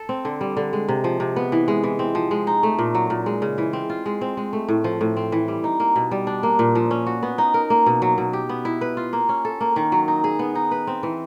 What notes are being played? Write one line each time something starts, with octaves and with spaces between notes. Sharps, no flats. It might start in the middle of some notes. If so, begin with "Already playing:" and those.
Already playing: A4
C4
D3
G3
D3
G#3
C3
F3
C3
B3
E3
G#3
E3
C4
F3
G#3
D#4
A3
A#2
F#3
A#2
G#3
C#3
E3
C4
F4
G#3
C4
G#3
A3
A2
F3
A2
C4
E3
G3
D#4
A#3
B2
G3
D4
A#3
A#2
F3
C#4
F#4
B3
D#4
A#4
A#3
B2
F#3
B2
G4
B3
E4
B4
F4
A#3
C#4
A4
A#3
D#3
F#3
D#4
G#4
B3
D#4
B4
C4
E3